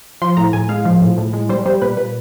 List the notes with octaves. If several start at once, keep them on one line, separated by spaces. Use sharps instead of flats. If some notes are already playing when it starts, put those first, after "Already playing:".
F3 C6
A2 A#5
A2 G#5
G#3 F5
F3
A2
A2
G#3
G3 C5
G3 C5
A#2 B4
A#2 B4